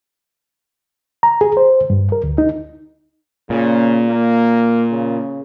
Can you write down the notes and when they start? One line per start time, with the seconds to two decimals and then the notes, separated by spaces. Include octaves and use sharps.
1.23 A#5
1.41 G#4
1.57 C5
1.90 G2
2.12 A#4
2.24 D2
2.38 D#4
3.50 A#2 C#3
4.09 A#3
4.91 C#3